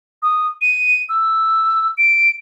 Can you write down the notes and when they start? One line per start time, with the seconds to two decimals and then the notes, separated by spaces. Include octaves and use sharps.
0.22 D#6
0.61 D#7
1.09 E6
1.97 D7